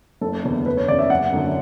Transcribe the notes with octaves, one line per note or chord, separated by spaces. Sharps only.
F#1 A4
E2 D3
F#1 B4
C#5
E2 C#3 E3 D5
E5
F#1 F#5
F#2 D3 F#3